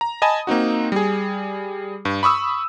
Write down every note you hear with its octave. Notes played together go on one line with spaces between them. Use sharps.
A#5
D#5 G#5 A5 B5 D#6
A#3 C4 D#4 F#4
G3 G#4
G2
B5 C#6 D#6 E6